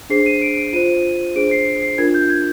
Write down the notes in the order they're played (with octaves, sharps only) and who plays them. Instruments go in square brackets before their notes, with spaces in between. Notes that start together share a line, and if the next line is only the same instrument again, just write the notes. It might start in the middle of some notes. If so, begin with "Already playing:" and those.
[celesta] D4 G#4 C5 C7
D#7
D7
D7
F4 C5 D#7
D4 G#4 C5 D7
C7
C7
D4 F4 A#4 G#6
G6
G#6